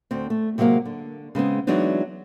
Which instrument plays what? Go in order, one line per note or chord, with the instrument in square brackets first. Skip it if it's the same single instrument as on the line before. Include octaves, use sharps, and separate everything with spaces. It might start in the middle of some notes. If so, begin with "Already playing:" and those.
[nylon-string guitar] D2 C4
A3
C3 F#3 G#3 A#3 F5
D3
C#3 G#3 B3 C4
E3 F#3 G#3 B3 D4 D#4